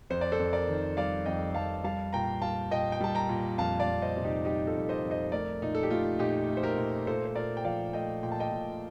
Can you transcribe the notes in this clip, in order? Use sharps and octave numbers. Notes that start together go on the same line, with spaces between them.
F2 C5
D5
A4 C5
F2
A#4 D5
D#3
G3 D5 F5
F2 D#5 G5
F2 F5 A5
G3 F5 A5
A#2 G5 A#5
G3 F5 A5
A#2 D#5 G5
G5
G3 A5
G5 A#5
A#2
F2 F5 A5
D5 F5
F2
C5 D#5
C3
D#4 G4
G3 D#4 G4
F4 A4
F2
C5 D#5
F2
C5 D#5
A3 A#4 D5
A#2 D#4
A4
G4
A3 F4
A#2 D#4 G4
A3
C5
G4 A#4
A#2
A#2 A4 C5
C5
A#2 A#4 D5
G5
F3 D5 F5
A3 D#5 G5
A#2 G5
A5
D#5 G5
A#2